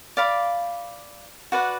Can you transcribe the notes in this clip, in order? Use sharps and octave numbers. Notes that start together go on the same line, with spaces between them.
D5 F5 B5 D6
F#4 B4 D5 F#5